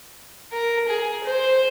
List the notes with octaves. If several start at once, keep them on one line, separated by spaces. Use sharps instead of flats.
A#4
G#4
C5